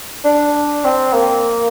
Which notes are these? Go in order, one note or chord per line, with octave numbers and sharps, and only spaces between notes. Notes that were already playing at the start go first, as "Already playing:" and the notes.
D4
C4
A#3